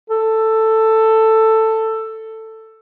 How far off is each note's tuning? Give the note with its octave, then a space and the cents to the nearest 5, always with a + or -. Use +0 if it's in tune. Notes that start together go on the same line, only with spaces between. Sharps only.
A4 +10